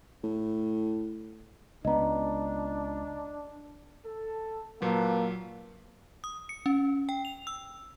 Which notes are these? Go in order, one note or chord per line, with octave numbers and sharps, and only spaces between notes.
A2
C#2 B3 D4 D#5 A#5
A4
A#2 F#3 A#3 B4 A5
D#6
C#7
C#4
G5
F7
E6